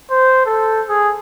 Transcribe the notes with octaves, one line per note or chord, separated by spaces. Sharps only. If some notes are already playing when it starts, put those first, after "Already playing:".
C5
A4
G#4